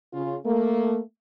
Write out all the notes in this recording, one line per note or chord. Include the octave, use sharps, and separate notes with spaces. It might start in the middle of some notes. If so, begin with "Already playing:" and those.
C#3 F4
A3 A#3